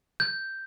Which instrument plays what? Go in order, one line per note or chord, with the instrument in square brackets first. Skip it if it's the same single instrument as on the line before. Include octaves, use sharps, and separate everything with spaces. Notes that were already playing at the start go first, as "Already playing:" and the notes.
[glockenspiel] G6